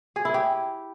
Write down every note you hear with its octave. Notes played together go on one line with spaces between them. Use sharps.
G#4
E4
G4